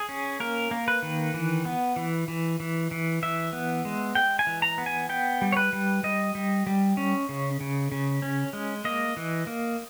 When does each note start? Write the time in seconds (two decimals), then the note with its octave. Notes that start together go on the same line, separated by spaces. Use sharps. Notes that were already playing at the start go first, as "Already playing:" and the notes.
Already playing: G#4
0.09 C#4
0.40 A#3 A#4
0.71 A#3
0.88 B4
1.02 D#3
1.34 E3
1.65 B3
1.96 E3
2.28 E3
2.60 E3
2.91 E3
3.23 E3 E5
3.53 B3
3.85 G#3
4.15 G#3 G5
4.39 G#5
4.47 E3
4.62 A#5
4.78 B3
4.86 G#5
5.09 B3 G5
5.42 G3
5.52 C#5
5.57 B4
5.73 G3
6.03 G3 D#5
6.35 G3
6.67 G3
6.97 C#4
7.29 C#3
7.61 C#3
7.92 C#3
8.22 C#4
8.53 G#3
8.85 A#3 D#5
9.17 E3
9.47 A#3